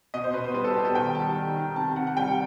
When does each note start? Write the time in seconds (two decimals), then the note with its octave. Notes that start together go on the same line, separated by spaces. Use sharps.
0.14 B2 D#5
0.24 C5
0.34 B2 B4
0.44 C5
0.54 G3 B4
0.64 A4
0.74 B2 G4
0.85 A4
0.95 D#3 G5
1.15 G3 A5
1.36 D#3
1.56 D#3
1.76 C3 A5
1.96 C3 F#5
2.07 F#5
2.17 G3 G5